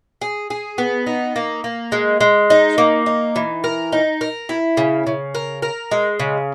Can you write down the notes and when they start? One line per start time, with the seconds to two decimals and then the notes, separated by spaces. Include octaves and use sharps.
0.21 G#4
0.50 G#4
0.78 B3
1.07 D#4
1.36 A#3
1.64 A#3
1.92 G#3
2.21 G#3
2.50 D#4
2.78 A#3
3.06 D#4
3.36 E3
3.64 A#4
3.92 D#4
4.21 A#4
4.49 E4
4.77 C#3
5.07 C#3
5.35 A#4
5.62 A#4
5.91 G#3
6.20 C#3